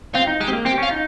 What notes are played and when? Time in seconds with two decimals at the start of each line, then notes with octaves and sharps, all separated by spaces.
0.15 C4 F4
0.27 D#4
0.40 G#3 G4
0.48 C4
0.53 A#3
0.65 C4 G4
0.78 C#4 F4
0.91 D#4